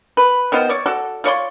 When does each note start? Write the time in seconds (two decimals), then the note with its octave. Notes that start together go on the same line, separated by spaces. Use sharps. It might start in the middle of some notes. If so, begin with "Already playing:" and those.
0.17 B4
0.52 D#3 B3 F4 C5
0.69 C#5 D5
0.86 F#4 A4 D5
1.24 F4 C#5 D5 C6